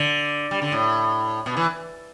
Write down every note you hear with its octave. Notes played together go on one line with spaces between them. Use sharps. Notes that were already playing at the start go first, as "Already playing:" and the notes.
Already playing: D3
G3
D3
A2
B2
E3